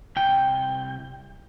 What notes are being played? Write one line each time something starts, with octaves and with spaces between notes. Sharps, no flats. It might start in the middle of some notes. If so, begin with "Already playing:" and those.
C2 G5